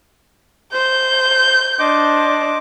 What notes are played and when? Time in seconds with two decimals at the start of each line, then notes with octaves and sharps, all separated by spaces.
0.73 C5 G6
1.79 D4 C5 D#5 D6